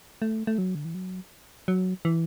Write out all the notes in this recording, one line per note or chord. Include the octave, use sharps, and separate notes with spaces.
A3
A3
F#3
D3
E3
F#3
F#3
E3